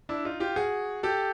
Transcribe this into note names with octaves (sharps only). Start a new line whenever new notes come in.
D4 E4
D#4 F4
F4 G4
F#4 G#4
G4 A4